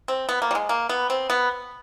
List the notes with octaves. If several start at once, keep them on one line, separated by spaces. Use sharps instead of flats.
C4
B3
A#3
G3
G#3
A#3
B3
C4
B3